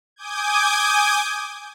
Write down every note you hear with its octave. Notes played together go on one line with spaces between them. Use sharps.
G#5 D6 D#6 G6 G#6